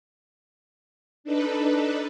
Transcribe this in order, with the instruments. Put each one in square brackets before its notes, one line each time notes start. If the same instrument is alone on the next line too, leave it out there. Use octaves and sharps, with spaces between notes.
[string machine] D4 D#4 A4 B4